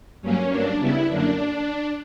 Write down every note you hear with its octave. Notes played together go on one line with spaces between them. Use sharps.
G2 F#3 A#3 C#4
G2 F#3 A#3 D4
C#3 G3 B3 E4
F#2 D3 A#3 D4